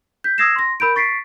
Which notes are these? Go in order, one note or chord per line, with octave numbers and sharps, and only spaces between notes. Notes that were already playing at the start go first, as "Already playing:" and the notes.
G6 B6
D#6 E6 G#6 A#6 C7 E7
C6 A#6
A#4 B5 G6 D7
C#6 A6 B6 C7 D7